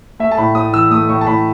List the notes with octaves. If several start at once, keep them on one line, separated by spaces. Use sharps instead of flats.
A3 E5
A5
A2 B5
A2 D#6
E3 E6
A3 D#6
A2 C#6
A5
A2 B5